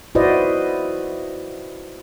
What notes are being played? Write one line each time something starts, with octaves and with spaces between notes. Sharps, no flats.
E4 F#4 B4 C5 D5 D#5